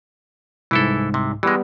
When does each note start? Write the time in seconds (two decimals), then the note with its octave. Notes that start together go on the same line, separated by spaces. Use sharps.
0.71 C2 G#2 E3 E4 A4
1.14 C3
1.43 E3 G3 G#3 B3